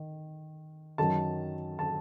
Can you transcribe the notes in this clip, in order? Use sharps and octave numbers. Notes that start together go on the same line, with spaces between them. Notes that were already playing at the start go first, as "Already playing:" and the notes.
Already playing: D#3
F#2 D#3 A5
A5